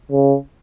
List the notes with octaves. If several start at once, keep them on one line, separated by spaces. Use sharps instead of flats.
C#3